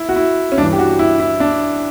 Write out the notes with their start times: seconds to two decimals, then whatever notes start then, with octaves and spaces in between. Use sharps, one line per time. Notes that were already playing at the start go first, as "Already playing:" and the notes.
Already playing: E4
0.09 F#4
0.16 E4
0.52 C#4
0.58 G2 E3 D4
0.73 G4
0.79 F#4
0.99 E4
1.20 E4
1.40 D4